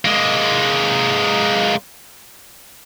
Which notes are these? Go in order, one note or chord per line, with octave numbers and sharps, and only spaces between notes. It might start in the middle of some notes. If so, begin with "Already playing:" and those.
G#3 A#3